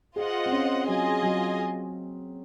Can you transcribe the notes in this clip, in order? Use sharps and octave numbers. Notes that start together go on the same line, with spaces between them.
F4 G#4 C5 D#5 F#5
C4
C#4
F#3 F4 G#4 D#5 G#5
F#3